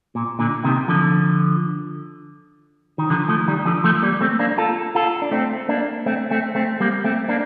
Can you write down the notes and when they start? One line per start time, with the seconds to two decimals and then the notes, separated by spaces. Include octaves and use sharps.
0.15 A#2
0.39 A#2 D3
0.64 C3 D#3
0.88 D3 F3
2.98 D#3
3.10 D3 F3
3.28 F3 A3
3.48 D#3 G3
3.66 D3 F3
3.84 F3 A3
4.03 G3 A#3
4.21 A3 C4
4.39 A#3 D4
4.58 F4 A4
4.95 F4 A4
5.22 D4
5.31 A3 C4
5.69 A#3 D4
6.06 A3 C4
6.31 A3 C4
6.55 A3 C4
6.80 G3 A#3
7.04 A3 C4
7.29 A#3 D4